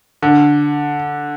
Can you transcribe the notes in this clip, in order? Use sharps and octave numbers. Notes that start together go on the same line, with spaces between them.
D3